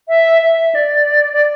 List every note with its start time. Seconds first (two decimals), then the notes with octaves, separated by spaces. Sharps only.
0.08 E5
0.42 E5
0.75 D5
1.33 D5